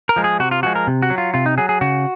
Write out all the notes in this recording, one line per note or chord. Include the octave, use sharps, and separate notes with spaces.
A#4
F3 G#3
G#4
C3 F#4
F4
F3 G#3 F#4
A#4
C3
F#4
F#3
F4
C3 F4
D#4
F#3 G#4
G#4
C#3 F#4